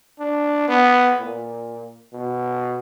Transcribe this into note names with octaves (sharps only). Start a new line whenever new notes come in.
D4
B3
A#2
B2